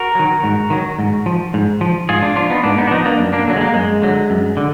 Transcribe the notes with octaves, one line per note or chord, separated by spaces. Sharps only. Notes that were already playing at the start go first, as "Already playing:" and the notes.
Already playing: F#4 A#4
D#3 F#3
G#2
D#3 F#3
G#2
F3
G#2
F3
G#2 F4 G#4
D4 F4
F3 D4 F4
B3 D#4
G#2 A#3 D4
B3 D#4
D4
F3 B3 D#4
A#3 D4
F#2
A#3 D4
D3 F#3
G#3
A#3
F#2 G#3
D3 F#3
F#2
D3